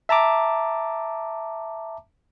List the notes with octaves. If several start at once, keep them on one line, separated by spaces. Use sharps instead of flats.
E5 A5 A#5 D6